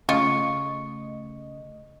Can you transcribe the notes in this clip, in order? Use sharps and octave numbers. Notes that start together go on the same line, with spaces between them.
C#3 A3 F4 D#5 C#6